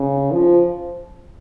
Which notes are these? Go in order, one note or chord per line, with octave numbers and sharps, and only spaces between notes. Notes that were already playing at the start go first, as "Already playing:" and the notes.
Already playing: C#3
F3